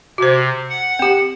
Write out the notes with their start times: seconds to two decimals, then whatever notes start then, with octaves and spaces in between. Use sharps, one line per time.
0.18 C3 F#4 C5
0.69 F#5
0.99 C4 G4